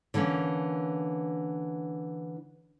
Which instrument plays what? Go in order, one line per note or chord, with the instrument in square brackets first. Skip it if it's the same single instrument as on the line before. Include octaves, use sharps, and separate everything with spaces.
[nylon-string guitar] D3 E3 A#3 C4 C#4